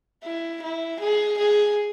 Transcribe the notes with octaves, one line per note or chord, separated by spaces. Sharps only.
E4
E4
G#4
G#4